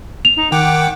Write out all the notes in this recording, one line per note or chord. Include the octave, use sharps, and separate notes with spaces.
F7
D#4
D#3 F#5 G5 D6